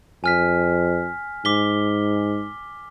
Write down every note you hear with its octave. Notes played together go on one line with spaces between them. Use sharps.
F2 G#5 F6 B6
G#2 D6 B6 G7